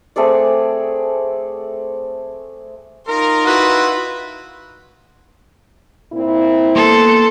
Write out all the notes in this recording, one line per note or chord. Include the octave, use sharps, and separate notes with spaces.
A3 C4 G#4 D5
D#4 F4 A#4 C6
E4 F#4 B4
A#2 C4 E4
A#3 B3 A4 C6